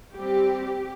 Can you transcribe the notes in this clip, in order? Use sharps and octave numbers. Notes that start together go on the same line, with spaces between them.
G3 C4 G4